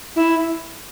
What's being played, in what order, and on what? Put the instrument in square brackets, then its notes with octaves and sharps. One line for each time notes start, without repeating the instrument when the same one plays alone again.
[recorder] E4